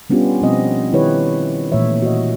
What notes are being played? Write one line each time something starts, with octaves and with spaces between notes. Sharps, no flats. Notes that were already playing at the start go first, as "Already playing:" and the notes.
G3 B3 C#4 D4 F4 G4
B2 F3 G3 C4 D#5
D#3 E4 G4 B4 C#5
A#2 E3 A3 C#5 E5
F#4 D#5